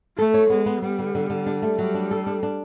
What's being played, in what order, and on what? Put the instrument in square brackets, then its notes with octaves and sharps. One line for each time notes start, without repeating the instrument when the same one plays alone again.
[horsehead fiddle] A3 [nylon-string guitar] A4
[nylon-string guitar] C#5
[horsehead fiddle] G#3 [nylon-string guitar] B3
[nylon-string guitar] B3
[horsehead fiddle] G3 [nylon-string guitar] B3
[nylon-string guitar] D3
D3
D3
D4
A3
[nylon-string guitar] F#3 [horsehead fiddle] G3
[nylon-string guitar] D4
A4
D4
D4